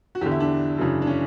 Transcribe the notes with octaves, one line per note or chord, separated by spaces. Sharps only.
F#4
E2 D3 G4
E4
D4
F#2 C#3 E3
D4
C#4